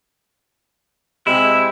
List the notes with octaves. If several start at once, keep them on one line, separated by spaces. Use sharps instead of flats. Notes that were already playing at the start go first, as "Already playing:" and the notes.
C3 G#3 E4